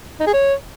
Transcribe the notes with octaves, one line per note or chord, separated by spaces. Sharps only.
D#4
G#4
C#5